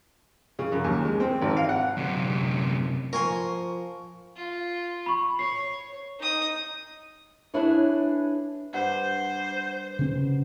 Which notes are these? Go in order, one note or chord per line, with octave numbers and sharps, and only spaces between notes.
C#3
F#2
D#2
G#3
C4
G#1
F5
F#5
F#2 C3
F3 A#4 G#5 C6 C#6
F4
B5 C#6
C#5 C7
D#4 D#6
D4 E4 G#4 B4 C#5
G2 C5 F#5
C#3 C#4